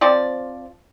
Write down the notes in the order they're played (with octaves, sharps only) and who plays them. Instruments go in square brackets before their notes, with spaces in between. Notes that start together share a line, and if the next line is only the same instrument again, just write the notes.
[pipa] F3 C4 D5